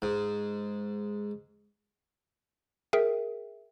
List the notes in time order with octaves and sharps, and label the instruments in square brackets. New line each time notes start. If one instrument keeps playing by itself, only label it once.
[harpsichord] G#2
[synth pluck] G#4 A#4 E5 G5